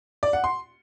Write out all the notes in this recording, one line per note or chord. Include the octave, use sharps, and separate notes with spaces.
D5
F#5
C6